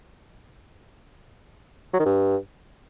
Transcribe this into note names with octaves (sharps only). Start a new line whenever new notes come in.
F#3
D#3
G2